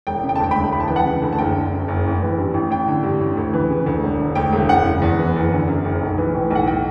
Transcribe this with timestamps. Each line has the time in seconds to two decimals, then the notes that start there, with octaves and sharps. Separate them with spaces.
0.07 E1 G5
0.24 C#3
0.29 G5
0.36 A5
0.40 D2 G5
0.51 G5 B5
0.57 E1
0.72 D2 B5
0.80 A5
0.88 E3 G5
0.96 F#5 A5
1.06 C#3
1.22 D2
1.33 A5
1.38 F#1 G5
1.55 D3
1.73 F#2
1.88 F#1
2.06 A1
2.22 E3
2.38 G2
2.54 A1
2.70 A1 G5
2.87 D3
3.03 G2
3.21 A1
3.37 D2
3.54 E3
3.70 C#3
3.86 D2
4.03 E1
4.19 D3
4.35 D2 G5
4.53 E1
4.69 F#1 F#5
4.85 C#3
5.02 E2
5.18 E3
5.36 F#1
5.52 D3
5.68 F#2
5.84 F#1
6.02 B1
6.18 E3
6.34 A2
6.51 B1 F#5
6.67 G5